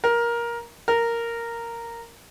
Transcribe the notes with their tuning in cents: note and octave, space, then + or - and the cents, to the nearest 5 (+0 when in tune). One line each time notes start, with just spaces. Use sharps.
A#4 +15
A#4 -5